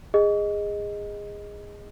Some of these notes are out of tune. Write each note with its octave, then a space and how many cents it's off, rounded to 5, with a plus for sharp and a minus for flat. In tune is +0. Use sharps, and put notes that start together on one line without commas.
G#4 -20 D#5 +0